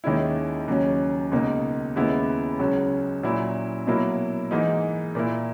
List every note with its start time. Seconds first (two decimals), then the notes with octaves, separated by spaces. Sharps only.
0.04 D#2 D#3 G#3 C#4 E4
0.68 D#2 C#3 F#3 C#4
1.32 C#2 B2 A#3 D#4
1.96 D#2 C#3 G#3 B3 E4
2.59 C#2 C#3 F#3 C#4
3.23 A#2 F#3 C#4 E4
3.87 B2 F#3 A#3 E4
4.51 G#2 E3 A#3 D#4
5.15 A#2 A#3 E4